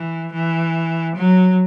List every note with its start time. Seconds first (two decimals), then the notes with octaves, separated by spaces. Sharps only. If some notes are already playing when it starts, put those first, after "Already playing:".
Already playing: E3
0.33 E3
1.16 F#3